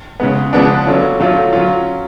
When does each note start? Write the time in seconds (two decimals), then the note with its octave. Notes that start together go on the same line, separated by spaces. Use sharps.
0.20 C#3 G#3 B3
0.53 C#3 F3 G#3 B3 D4
0.86 D3 F#3 C#4 F4
1.20 D3 F#3 A3 F4
1.53 F#3 C#4 F4